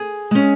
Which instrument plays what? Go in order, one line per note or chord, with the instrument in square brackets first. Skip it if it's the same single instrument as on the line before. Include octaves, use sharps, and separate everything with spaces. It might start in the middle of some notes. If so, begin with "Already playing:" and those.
Already playing: [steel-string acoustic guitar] G#4
G#3 C#4